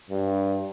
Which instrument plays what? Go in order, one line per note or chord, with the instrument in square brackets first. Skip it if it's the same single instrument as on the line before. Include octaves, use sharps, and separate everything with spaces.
[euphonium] G2